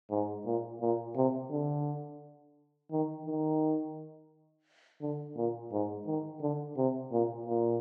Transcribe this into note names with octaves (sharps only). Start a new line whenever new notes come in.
G#2
A#2
A#2
C3
D3
D#3
D#3
D3
A#2
G#2
D#3
D3
C3
A#2
A#2